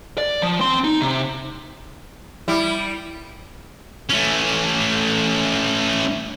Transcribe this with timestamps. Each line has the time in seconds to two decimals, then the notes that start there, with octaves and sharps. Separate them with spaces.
0.18 D5
0.42 F3
0.60 C4 C6
0.84 D#4
1.01 C3
2.48 G3 E4
4.09 A3 C#4